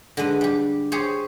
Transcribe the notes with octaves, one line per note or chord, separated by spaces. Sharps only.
D3 G#3 B4
G3 G4
G4 G#4 C5 C#5